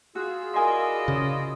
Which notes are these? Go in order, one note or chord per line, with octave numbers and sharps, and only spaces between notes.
F4 F#4 G#4 E6
E4 A#4 D5 D#5 G#5 C6
C#3